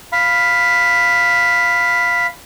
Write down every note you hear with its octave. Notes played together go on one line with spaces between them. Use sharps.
F5 B5